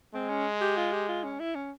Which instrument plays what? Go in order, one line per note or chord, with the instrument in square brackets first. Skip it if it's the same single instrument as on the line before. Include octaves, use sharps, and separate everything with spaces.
[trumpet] G#3 [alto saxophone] C4
[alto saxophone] C#4
G4
F4
G4
F4
C#4
E4
C#4